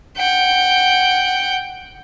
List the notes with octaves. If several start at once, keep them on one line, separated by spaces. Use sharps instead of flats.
F#5 G5